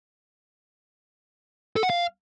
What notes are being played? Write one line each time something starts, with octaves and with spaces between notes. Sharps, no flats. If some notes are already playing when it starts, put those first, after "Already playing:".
A4
F#5
F5